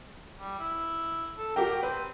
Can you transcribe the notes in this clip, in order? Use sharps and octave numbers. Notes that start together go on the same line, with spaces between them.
G3
E4
A4
F#4 G4 A#4 G5
C4 B4